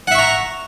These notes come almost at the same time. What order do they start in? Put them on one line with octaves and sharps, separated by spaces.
F#5 E5 C#6 A#5